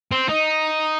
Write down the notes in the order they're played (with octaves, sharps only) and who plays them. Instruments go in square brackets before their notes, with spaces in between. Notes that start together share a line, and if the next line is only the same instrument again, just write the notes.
[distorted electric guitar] C4
D#4